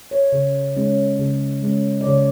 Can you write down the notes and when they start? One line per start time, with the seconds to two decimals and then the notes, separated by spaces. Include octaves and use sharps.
0.11 C#5
0.32 C#3
0.76 G#3 C#4
1.19 C#3
1.63 G#3 C#4
2.01 D5
2.06 C#3 C#5